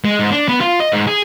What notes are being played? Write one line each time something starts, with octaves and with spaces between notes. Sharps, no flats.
G#3
G#2
D4
B3
F4
D#5
G#2
G#4